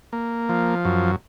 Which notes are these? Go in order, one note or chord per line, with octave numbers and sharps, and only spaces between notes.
A#3
F3
F#2